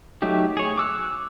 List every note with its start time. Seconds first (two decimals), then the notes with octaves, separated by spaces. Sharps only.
0.22 F#3 A3 D#4 G4
0.57 G#4 C#5
0.78 D6 E6 F#6